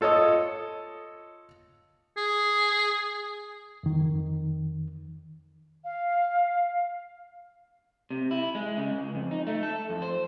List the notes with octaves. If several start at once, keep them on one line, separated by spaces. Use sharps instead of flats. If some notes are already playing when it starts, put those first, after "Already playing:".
F4 A4 C#5 D#5 D#6
G#4
F2 D#3
F5
C3
E4
G#3
C#3
C#2
F2
D#4
A3
A4
F2
C5